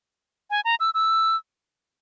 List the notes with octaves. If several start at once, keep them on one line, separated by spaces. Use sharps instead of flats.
G#5
A#5
E6
E6